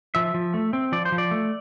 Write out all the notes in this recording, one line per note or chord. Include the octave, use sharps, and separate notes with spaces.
F3 E5
F3
A3
C4
F3 D5
C5
F3
D5
A3